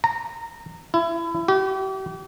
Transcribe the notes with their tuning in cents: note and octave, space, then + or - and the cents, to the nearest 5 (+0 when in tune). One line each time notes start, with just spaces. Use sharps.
A#5 -20
E4 +25
G4 -40